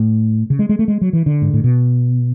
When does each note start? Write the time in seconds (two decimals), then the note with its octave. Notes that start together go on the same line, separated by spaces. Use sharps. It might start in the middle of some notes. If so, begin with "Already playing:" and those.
Already playing: A2
0.50 C#3
0.59 G#3
0.69 G#3
0.79 A3
0.88 G#3
1.01 F#3
1.13 E3
1.26 D3
1.42 G#2
1.53 A2
1.64 B2